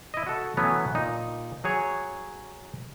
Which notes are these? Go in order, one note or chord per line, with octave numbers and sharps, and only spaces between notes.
E4 D#5
F#4 A4
E3 F#3 A3 B3 C#4
A#2 D#4
F#3 G#4 C#5